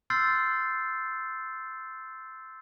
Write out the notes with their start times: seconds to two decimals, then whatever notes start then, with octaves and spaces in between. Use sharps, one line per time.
0.10 C6 E6 F6 G6 A6 C7